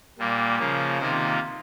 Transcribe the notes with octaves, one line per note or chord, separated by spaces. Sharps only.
A#2 G3 A#3
C#3 F3 A#3
C3 D#3 A#3 F4 C5